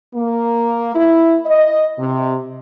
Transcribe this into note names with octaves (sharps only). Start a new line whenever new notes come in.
A#3
E4
D#5
C3